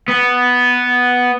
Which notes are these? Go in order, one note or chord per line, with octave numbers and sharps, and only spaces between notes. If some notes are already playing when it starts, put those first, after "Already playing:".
B3